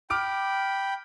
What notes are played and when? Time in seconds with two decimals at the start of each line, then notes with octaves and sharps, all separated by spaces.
0.10 G5 B5 D6 F6 D7